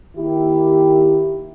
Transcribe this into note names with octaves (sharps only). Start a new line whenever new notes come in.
D#3 A#3 E4 G4